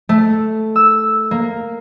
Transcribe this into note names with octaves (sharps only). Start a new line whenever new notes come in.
A3
E6
A#3